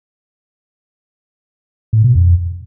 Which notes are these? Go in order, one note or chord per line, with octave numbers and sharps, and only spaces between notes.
A2
B2
F2